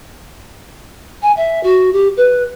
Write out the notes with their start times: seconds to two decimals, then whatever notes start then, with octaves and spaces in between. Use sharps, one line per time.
1.22 G#5
1.36 E5
1.63 F#4
1.93 G4
2.17 B4